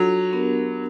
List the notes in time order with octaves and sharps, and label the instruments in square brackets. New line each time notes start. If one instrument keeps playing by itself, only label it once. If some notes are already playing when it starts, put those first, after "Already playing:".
Already playing: [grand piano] F#3 [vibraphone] D4 F4 A4
[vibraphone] B3 D4 G4 A#4